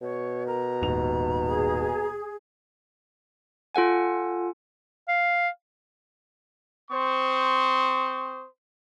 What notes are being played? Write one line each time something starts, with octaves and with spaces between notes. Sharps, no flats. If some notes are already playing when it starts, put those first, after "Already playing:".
B2 C#5
A#4 A#5
D#1 G#2 F7
G#4
F4 A4 F#5 G#5
F5
C4 C5 C#6 D#6